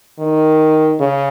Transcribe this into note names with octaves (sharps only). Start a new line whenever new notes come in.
D#3
C#3